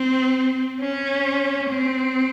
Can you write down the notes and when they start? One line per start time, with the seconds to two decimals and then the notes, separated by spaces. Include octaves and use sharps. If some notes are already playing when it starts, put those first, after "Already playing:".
Already playing: C4
0.81 C#4
1.69 C4